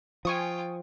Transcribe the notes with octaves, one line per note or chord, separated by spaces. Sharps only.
F3 F4 G5 G#5 C#6 D#6